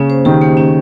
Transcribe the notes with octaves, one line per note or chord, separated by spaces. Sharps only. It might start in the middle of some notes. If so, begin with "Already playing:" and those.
Already playing: C#3 A#3 C#4
C5
D#3 G4
A#3
C#4